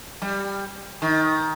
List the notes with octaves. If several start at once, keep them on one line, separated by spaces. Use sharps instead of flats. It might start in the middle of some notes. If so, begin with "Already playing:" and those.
G3
D#3